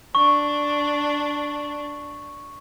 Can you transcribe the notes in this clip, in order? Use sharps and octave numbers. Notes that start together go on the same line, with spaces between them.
D4 C#6